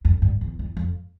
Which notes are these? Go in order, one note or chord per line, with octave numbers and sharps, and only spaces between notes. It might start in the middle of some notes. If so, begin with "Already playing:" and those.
F2
G2
E2
E2
F2